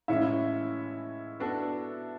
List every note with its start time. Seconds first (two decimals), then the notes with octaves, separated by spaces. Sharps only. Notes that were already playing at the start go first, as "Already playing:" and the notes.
0.08 A2 E3 G#3 C#4 E4 E5
1.40 B3 D4 F#4 A4